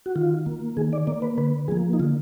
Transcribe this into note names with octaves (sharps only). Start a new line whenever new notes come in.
F#4
D#3 F4
A#3
D#3 G#4
D5
A#3 D5
B4
D3 B4
F3 A#3 G#4
D#4
D3 F4